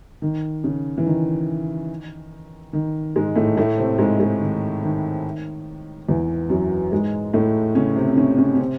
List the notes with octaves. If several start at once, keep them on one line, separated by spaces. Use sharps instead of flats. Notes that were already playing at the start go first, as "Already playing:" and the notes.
D#3
C#3
E3
D#3
D#3
G#2 G#3
A2 A3
A2 A3
C3 C4
G#2 G#3
G#2 G#3
D#3
D#3
E2 E3
F#2 F#3
G#2 G#3
A2 A3
C#3 C#4
C3 C4
C4
C#3 C#4
C#3 C#4
C#4
C3 C4